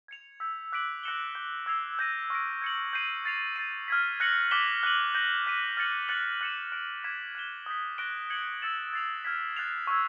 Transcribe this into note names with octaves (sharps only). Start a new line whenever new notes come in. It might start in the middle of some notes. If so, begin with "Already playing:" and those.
G#6 C#7 F7
E6 G6 B6
D6 F#6 B6 D7 F#7
F#6 A#6 C#7 E7 G7
D6 G6 B6
E6 G#6 C7 F7
E6 G6 A#6 D#7
C#6 F6 A#6 D7
G#6 C#7 F#7
G6 C7 D#7
A6 C7 F7
A6 C7 D#7
F6 G#6 B6
F#6 A#6 C#7 F#7
D6 F#6 B6 E7 G7
F#6 B6 D#7 F#7
G6 A#6 D#7
F#6 B6 D#7
F6 A6 C#7 F#7
F#6 A6 C#7 F#7
F#6 A6 C#7 E7
F#6 A#6 D7
D6 F6 G#6 B6 E7
F#6 B6 E7 G7
D#6 G6 B6
C#6 F#6 A#6 D7 G7
G#6 C#7 F#7
E6 A6 C#7 E7
A6 C7 F7
F6 G#6 B6
F#6 A6 C7 F7
C#6 E6 G#6